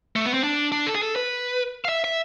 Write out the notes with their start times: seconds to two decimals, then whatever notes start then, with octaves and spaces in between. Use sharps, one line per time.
0.16 A3
0.25 B3
0.34 C4
0.44 D4
0.72 D4
0.87 A4
0.95 G#4
1.02 A4
1.16 B4
1.85 F5
1.89 E5
2.04 E5